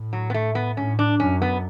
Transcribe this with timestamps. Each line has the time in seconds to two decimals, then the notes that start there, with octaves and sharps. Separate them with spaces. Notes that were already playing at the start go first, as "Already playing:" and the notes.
Already playing: A2
0.13 F#3
0.30 B3
0.34 A3
0.55 B3
0.77 A2 C#4
0.99 D4
1.20 F#2 C#4
1.42 B3